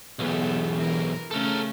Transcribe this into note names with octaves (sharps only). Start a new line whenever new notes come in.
B1 E2 B3 G4 A4
E3 A#4
C#3 A3 C#4 A4 A#4